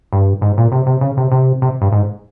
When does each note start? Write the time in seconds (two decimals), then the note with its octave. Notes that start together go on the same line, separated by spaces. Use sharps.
0.13 G2
0.41 G#2
0.57 A#2
0.72 C3
0.86 C3
1.01 C#3
1.17 C3
1.32 C3
1.62 C3
1.81 G2
1.92 G#2